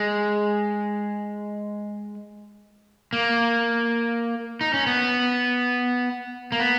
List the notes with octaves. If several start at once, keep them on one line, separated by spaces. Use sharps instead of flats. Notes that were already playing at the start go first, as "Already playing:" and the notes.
Already playing: G#3
A#3
D#4
C#4
B3
A#3
B3